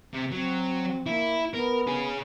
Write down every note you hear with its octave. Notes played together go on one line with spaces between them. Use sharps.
C3
F#3 C4
A#3 E4
B3 A#4
C#4 G#4